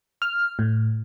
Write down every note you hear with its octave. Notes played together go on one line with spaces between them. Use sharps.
F6
A2